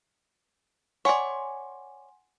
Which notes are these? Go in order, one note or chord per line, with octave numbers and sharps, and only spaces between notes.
C#5 D5 F#5 G#5 C6